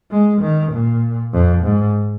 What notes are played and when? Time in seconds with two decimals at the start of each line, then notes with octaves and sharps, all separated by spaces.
0.11 G#3
0.41 D#3
0.72 A#2
1.32 F2
1.64 G#2